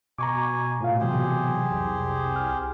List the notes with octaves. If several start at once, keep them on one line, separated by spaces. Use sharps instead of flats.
B2 G#5 A#5 C#6 D6
A2 F4 F5
C3 E3 F#3 G4 G#4 C5
C2 F2
F6